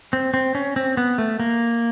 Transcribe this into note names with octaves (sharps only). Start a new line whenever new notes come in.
C4
C4
C#4
C4
B3
A3
A#3